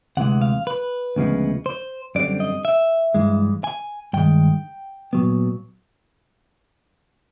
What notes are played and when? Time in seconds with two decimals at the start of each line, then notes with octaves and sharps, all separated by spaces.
0.17 D2 C3 E3 G#3 F#5
0.41 F5
0.67 B4
1.16 D2 C#3 F3 G#3 B3
1.66 C5
2.15 F#2 D3 G3 C4 D5
2.40 D#5
2.65 E5
3.14 G2 E3 G#3
3.64 G#5
4.13 G2 D#3 G#3 G5
5.13 A#2 F#3 B3